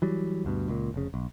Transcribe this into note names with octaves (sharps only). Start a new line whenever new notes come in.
E3 F#3 G3
D2 G2 B2
C#2 A#2
F1 C#3
B1